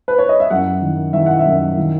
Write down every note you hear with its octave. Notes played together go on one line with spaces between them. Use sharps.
B4
C#5
D#5
E5
F#2 F#5
D#3
D#3 E5
F#5
E5
F#2
D#3